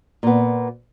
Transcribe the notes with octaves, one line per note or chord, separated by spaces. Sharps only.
A#2 B3